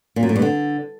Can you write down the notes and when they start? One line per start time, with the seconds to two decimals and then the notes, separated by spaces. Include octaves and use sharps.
0.16 A#2
0.23 F#2
0.29 A2
0.36 G2
0.42 D3